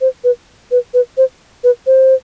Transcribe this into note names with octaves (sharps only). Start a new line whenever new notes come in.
C5
B4
B4
B4
C5
B4
C5